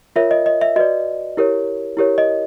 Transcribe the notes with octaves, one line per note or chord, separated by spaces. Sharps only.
F4 A#4 C#5 E5
D#5
D#5
E5
F#4 B4 D5 D#5
E4 G4 A#4 C#5
E4 G4 A#4 C#5
D#5